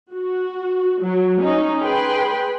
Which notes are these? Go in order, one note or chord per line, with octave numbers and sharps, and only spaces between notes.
F#4
F#3
C#4 D#4
G#4 B4 G5 B5 C6